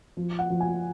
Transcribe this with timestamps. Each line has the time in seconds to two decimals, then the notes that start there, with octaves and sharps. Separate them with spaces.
0.17 F3
0.39 F#5
0.50 F3
0.60 G#5